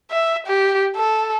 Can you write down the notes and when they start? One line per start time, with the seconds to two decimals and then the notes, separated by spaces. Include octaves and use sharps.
0.11 E5
0.47 G4
0.96 A4